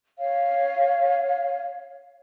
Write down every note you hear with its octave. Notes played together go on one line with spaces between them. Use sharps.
C#5 F5